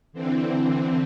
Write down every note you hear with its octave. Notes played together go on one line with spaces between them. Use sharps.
D3 E3 C4